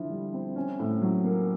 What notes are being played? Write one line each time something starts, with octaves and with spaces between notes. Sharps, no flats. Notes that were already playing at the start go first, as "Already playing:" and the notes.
Already playing: D3 F3 E4
G3
C4
C#4
A2
F#3
A#3